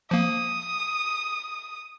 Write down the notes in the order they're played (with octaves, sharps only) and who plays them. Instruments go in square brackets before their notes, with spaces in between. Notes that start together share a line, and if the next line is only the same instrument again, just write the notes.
[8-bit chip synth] F3 A#3 [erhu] D#6